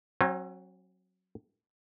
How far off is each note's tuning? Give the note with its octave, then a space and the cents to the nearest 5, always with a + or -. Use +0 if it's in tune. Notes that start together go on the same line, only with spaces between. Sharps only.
F#3 +0 C4 +45